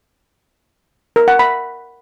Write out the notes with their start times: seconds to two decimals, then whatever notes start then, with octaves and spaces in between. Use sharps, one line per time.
1.16 A#4
1.28 F#5
1.39 B5